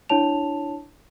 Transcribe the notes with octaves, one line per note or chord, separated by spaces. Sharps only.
D4 E4 C#5 A5 F7